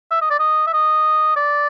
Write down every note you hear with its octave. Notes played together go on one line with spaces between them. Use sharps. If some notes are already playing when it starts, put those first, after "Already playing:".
E5
D#5
D5
D#5
E5
D#5
D5